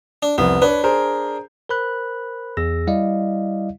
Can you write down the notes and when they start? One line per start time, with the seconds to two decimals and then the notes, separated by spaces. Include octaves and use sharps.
0.23 D4
0.38 C2 F2 B3
0.62 D4 B4 C#5
0.84 G#4 A#4 C5
1.69 A#4 C5 B5 F#6
2.57 E2 G#4 E6 A#6
2.87 G3 E4 D5 D#5 F5